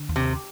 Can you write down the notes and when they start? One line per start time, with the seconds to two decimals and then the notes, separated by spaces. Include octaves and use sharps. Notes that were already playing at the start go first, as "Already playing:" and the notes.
Already playing: D3
0.09 D#2
0.16 C3